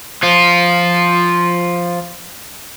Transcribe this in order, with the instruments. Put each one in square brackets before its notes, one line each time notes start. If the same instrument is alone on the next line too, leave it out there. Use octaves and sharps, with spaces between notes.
[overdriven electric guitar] F3 F4